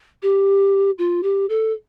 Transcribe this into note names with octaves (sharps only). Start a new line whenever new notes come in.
G4
F4
G4
A4